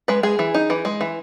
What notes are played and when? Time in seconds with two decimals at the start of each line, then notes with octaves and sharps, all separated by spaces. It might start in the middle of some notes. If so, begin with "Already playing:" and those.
0.08 G#3 B4
0.23 G#3 G#4
0.39 E3
0.54 D#4
0.70 E3
0.85 G#3
1.01 E3